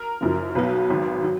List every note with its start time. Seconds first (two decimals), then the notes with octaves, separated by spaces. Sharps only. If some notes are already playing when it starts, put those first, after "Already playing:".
Already playing: A#4
0.21 F#1 F#2 F3
0.55 B1 B2 F#3 B4
0.89 G#1 G#2 F#3
1.24 F#3